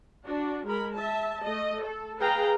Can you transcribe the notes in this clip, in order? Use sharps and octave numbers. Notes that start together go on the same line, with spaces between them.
D4 F#4
G#3 A#4 B5
E5 A5
A3 D#5
A4
G#4 B4 F5 G5 A#5